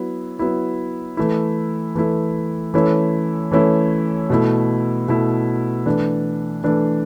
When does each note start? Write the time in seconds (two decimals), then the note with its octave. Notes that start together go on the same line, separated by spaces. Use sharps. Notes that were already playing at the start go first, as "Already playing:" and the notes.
Already playing: F#3 B3 E4
0.39 F#3 B3 E4
1.17 E3 A3 E4
1.95 E3 A3 E4
2.74 E3 A3 C#4 E4
3.51 E3 A3 C#4 E4
4.30 B2 A3 E4
5.08 B2 A3 E4
5.86 E3 A3 D4
6.64 E3 A3 D4